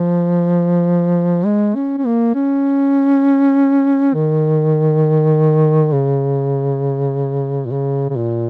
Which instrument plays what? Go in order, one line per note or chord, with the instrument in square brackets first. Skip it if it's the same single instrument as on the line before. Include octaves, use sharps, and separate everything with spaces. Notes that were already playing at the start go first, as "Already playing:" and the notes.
Already playing: [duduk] F3
G#3
C#4
C#4
A#3
C#4
D#3
C#3
A#2
C#3
C#3
A#2